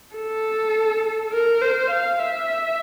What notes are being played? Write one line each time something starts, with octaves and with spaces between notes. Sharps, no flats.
A4
A#4
C5
F5
E5